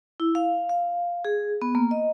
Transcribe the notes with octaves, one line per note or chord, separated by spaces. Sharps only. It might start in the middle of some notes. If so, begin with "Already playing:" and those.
E4
F5
F5
G#4
B3
A#3
D#5